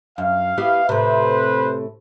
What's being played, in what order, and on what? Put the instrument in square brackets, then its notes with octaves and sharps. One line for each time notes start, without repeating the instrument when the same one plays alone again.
[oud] F#2 [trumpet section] F5
[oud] B3 E4 G4
[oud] A2 C3 [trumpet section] B4 C5